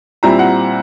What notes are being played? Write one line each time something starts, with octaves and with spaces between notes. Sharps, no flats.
A#2 G3 C4 E4 A#5
F#5